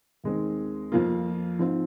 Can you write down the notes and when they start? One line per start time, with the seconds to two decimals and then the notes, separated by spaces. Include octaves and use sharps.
0.24 D#2 D#3 G#3 C4
0.92 F2 F3 A#3 F4
1.59 G#2 F3 C4